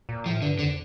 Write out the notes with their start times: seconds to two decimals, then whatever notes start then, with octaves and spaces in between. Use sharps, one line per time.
0.09 A#2
0.26 A2 F3
0.42 G2 D3
0.59 F2 D3